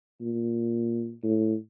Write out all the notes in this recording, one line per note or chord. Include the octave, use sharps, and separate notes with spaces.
A#2
A2